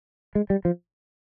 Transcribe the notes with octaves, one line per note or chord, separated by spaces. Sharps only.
G#3
G3
F3